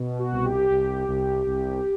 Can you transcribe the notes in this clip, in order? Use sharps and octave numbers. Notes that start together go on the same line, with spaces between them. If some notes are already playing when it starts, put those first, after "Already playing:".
Already playing: B2
F#4
C2
G4
C2
C2
C2